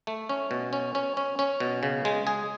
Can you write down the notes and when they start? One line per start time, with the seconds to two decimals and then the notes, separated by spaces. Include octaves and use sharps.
0.07 A3
0.29 C#4
0.51 B2
0.73 C#4
0.95 C#4
1.17 C#4
1.39 C#4
1.60 B2
1.83 C#3
2.05 G#3
2.27 G#4